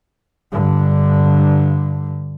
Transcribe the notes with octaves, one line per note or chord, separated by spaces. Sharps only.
G2 D3